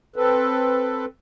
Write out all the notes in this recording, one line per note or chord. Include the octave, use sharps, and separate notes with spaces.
C4 A4 B4